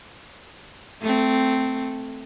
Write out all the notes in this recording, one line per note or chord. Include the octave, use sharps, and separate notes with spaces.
A3 C4